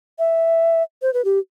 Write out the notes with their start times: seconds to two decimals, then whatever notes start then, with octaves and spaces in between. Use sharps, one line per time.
0.19 E5
1.02 C5
1.14 B4
1.25 G4